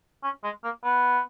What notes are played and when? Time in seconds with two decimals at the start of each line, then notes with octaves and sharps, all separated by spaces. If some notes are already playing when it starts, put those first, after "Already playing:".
0.24 C#4
0.44 G#3
0.64 A#3
0.84 B3